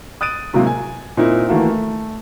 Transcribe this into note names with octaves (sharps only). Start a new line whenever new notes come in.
D#6 F#6 A6 D7 D#7
A2 C3 F#3 G#3 A#3 G#4
G#5
A#2 C4 D#4 E4
D#3 E3 A3 A#3 F#4
A3